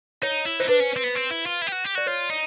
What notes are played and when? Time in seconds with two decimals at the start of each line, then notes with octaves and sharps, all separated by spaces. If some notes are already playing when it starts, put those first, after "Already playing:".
0.23 D#4 C#5
0.46 E4
0.60 D#4 C5
0.68 D4 B4
0.80 C#4
0.96 C4
1.04 B3
1.15 C4
1.30 E4
1.46 F4
1.62 E4
1.67 G4
1.72 F#4
1.85 G4
1.95 F#4 D5
2.07 F4 C#5
2.30 D#4